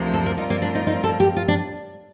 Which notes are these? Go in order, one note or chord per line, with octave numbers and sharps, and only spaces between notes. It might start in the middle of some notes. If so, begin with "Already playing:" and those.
Already playing: D2 C3 F3 A#3
A4
A#4
A2 G3 C4 D#4 F4 A#4
A#3
D4
D#4
D#4
A4
G4
F4
D4